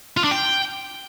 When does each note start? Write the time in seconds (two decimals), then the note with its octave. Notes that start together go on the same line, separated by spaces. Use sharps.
0.17 F4
0.24 D4
0.31 G5